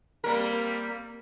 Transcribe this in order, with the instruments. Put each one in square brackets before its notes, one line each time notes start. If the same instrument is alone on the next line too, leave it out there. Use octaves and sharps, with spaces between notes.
[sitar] G3 A#4 [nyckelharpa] A#3 C4